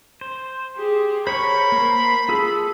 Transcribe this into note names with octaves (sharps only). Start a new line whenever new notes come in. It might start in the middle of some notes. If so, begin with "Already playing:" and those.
C5
G4 G#4
A#4 C5 C#5 B5 C#6
A#3 C5
F4 G#4 A4 E6